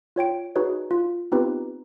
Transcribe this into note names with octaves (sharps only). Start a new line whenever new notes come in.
F4 C#5 G5 D7
D#4 F#4 G#4 B4 C#5
F4
B3 C4 D#4 F4 G4 B4